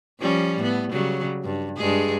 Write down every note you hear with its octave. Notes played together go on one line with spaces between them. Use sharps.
F3 G3 C#4
A2 B3
C#3 F#3 G3
G2
G2 G#3 G#4